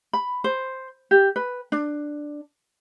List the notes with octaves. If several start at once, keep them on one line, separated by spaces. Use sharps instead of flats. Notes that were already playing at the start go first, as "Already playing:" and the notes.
B5
C5
G4
B4
D4